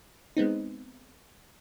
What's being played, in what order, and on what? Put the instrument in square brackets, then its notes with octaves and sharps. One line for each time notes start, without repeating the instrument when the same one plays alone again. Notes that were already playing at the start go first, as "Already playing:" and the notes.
[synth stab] G#3 B3 C4 D#4